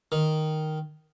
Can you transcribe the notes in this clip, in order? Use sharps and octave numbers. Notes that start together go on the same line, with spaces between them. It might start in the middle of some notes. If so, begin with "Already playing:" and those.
D#3